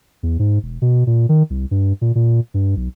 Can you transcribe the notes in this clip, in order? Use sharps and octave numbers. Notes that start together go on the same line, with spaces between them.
E2
G#2
E1
B2
A#2
D#3
C2
G2
A#2
A#2
G2
B1